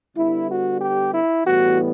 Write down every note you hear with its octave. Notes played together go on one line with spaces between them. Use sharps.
D3 G3 B3 E4
F#4
G4
E4
A2 E3 G3 B3 F#4